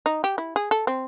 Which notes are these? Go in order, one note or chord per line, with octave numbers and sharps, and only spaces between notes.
D#4
G4
E4
G#4
A4
C4